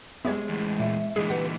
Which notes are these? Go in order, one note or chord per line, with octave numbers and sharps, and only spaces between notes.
G#3 B3 C4 E4 G4 C#5
E2 A2
A#2 E5
A#2 D3 E3 G#3 G#4 D#5
G4 B4 F#5